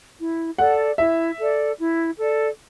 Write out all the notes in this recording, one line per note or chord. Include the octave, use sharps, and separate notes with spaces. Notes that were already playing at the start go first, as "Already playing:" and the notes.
E4
A4 D5 F#5
E4 E5
A4 D5
E4
A4 D5